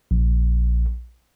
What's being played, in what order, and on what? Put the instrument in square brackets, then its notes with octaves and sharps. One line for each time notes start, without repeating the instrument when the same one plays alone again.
[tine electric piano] A#1